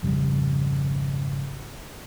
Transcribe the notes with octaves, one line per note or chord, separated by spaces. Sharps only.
G#1 F2 C#3 G3